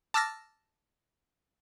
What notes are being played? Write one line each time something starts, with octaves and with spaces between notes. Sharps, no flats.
A5 D6 E6 F6 A6 A#6